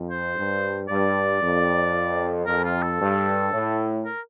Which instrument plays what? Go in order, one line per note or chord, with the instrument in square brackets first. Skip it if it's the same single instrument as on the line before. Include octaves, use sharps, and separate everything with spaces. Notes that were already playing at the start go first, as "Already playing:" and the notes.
Already playing: [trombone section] F2
[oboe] C5
[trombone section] G2
[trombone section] G2 [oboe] D5
[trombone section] F2
[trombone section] F2 [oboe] A#4
[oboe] F4
A4
[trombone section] G2
A2
[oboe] A#4